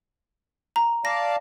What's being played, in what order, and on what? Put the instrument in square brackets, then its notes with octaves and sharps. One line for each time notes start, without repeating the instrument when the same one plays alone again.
[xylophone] A#5
[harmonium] D5 F5 A5 [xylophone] A#6